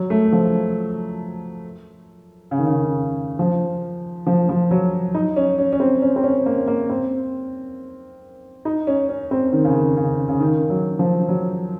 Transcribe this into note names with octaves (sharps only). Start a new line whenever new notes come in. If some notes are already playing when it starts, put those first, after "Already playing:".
Already playing: F#3
A3
F3
C#3
D#3
C#3
F3
F3
F3
F#3
D#4
C#4
C#4
C#4
C4
C#4
C4
C#4
A#3
A#3
C4
D#4
C#4
C#4
C4
D#3
C#3
D#3
C#3
C#3
D#3
F#3
F3
F#3